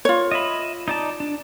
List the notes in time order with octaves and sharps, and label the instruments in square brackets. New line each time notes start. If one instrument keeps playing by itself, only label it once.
[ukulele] F4 C#5
[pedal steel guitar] D#5 E5 B5
D#4 D5 A5
D4